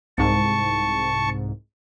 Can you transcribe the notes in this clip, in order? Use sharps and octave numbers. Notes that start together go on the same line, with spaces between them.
C2 G#2 A5 C#6